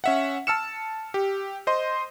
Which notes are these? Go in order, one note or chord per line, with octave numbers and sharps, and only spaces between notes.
C#4 E5 F#5
A5 E6 F6 C#7 E7
G4
C5 D#5 C6